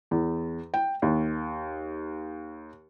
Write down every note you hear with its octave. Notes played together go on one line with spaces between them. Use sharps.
E2
G5
D#2